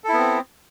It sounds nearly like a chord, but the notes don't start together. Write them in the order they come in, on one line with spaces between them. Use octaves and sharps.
A4 E4 B3 C4